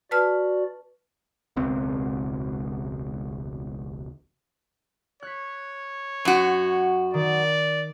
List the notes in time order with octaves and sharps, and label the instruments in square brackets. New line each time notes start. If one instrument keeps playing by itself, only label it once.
[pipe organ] F#4 D5 [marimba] B4 A5 F6
[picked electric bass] E1 C#2 C4
[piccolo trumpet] C#5 [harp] F#6 B6
[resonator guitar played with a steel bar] F#2 F#4
[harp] D#3 [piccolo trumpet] D5